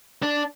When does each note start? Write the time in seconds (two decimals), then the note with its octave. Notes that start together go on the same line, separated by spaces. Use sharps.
0.23 D4